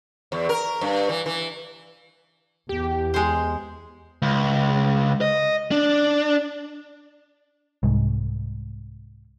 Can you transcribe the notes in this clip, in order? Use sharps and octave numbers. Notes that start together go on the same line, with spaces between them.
E2
A#4
G2
E3
E3
E2 G4
G#3 C5
C#2
D#5
D4
C2 G#2